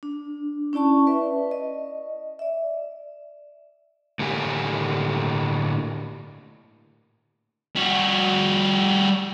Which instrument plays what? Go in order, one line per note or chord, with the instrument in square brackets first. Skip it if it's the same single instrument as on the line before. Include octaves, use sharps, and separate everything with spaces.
[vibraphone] D4
C#4 E4 D5 A5 C#6
B4 D5 E5
D#5
D5 E5
[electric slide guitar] A2 D3 A#3 G4 G#5
[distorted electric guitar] G3 F#4